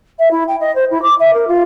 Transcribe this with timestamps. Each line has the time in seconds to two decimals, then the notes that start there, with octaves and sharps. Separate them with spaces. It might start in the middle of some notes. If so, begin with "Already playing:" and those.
0.19 E5
0.31 E4
0.48 G5
0.60 D#5
0.75 C5
0.91 E4
1.02 D6
1.20 E5
1.34 A#4
1.48 F4